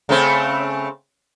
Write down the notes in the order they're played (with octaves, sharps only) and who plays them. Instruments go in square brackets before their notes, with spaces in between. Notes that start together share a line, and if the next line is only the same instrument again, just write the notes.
[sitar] C#3 A3 C4